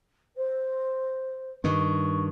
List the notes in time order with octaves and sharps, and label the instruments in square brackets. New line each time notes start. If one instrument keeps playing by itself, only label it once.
[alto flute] C5
[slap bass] G2 D#3 [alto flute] C#6